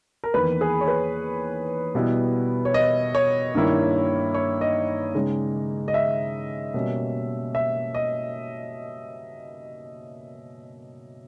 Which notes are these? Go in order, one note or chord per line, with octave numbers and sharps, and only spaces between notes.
A#4
E2 D#3 A#3 B4
G#4
C#5
B4
B2 G3 B3 E4
C#5
D#5
C#5
G2 D#3 A#3 E4
C#5
D#5
C#3 G#3 D#4
D#5
E5
B2 G3 A#3 C#4
E5
D#5